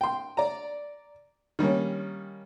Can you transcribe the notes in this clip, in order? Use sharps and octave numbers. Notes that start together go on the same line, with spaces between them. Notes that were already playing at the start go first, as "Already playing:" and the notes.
G5 C6
D5 A#5
D#3 G3 A#3 C#4